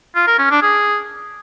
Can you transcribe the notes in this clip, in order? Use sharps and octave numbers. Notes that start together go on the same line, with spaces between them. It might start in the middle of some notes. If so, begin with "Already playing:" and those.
F4
A#4
C#4
D4
G#4